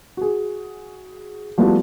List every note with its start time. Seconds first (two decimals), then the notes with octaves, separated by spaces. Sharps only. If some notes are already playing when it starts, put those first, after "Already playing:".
0.17 F#4 G#4
1.58 F3 G3 A3 B3 E4 F#4